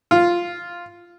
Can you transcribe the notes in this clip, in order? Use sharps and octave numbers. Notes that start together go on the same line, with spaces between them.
F4